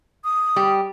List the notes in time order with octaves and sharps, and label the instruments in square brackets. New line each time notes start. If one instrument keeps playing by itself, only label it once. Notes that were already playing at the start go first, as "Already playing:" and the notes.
[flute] D#6
[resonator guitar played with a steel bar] G3 G4